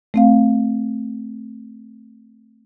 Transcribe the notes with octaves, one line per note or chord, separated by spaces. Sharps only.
A3 C4 F5